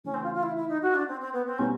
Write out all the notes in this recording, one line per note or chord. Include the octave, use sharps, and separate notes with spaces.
C#3 E3 A3 C#4
C4
F4
F4
E4
E4
D#4
F#4
D4
C4
C4
B3
C4
B2 G3 B3 C#4 D#4 G4